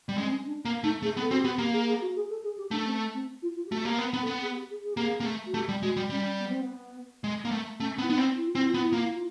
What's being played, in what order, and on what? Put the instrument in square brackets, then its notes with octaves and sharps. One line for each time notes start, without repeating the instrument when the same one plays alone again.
[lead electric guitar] G3
[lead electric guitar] G#3 [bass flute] C#4
[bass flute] C4
C#4
D4
[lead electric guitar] A#3
[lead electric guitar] A3 [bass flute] D#4
[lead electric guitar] A3 [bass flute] G#4
[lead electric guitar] B3
[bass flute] A4
[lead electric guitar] C4 [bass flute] F#4
[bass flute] G4
[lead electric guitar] B3
[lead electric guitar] A#3 [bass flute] G4
[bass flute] G#4
G#4
F#4
G#4
A4
G#4
G4
[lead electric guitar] A3 [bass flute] D4
[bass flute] C4
C4
F4
F4
G4
[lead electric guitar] A3 [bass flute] F#4
[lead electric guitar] A#3 [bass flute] G4
[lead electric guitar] B3
B3
[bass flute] A4
[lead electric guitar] B3
[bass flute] G#4
G4
G#4
G#4
[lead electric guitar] A#3 [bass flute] G4
[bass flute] G#4
[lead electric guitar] A#3
A3
[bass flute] F#4
[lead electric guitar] A3 [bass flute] G4
[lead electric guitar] G3
[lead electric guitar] G#3 [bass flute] F#4
[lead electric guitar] G3
[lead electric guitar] G3 [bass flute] C#4
[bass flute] B3
C4
B3
[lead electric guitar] G#3
A#3
A3
[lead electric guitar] A3 [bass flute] C#4
[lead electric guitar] B3
[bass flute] E4
[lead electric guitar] B3 [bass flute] D#4
[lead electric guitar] C4
[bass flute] E4
F4
[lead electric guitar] C4
[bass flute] E4
[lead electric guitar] B3 [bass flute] F4
[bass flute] E4
[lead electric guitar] A#3 [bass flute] F4
[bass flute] E4
F4